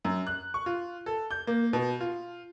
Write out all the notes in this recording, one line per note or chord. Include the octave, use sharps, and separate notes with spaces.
F#2
F#6
C#6
F4
A4
G6
A#3
B2
F4